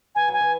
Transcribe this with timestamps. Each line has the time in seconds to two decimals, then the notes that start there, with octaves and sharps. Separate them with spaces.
0.15 E3 G#5
0.28 F#3
0.33 G#5
0.41 E3